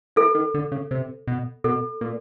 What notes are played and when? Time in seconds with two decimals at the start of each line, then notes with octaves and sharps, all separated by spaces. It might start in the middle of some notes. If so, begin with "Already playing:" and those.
0.16 E3 A4
0.35 D#3
0.54 D3
0.72 C#3
0.91 C3
1.28 B2
1.64 B2 A4
2.01 A#2